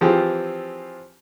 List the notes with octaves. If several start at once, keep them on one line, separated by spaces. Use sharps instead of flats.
E3 F3 C4 F4 G4 G#4